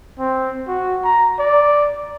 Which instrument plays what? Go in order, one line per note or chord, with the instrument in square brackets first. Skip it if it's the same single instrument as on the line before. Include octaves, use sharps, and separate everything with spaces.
[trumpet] C4
F#4
A#5
D5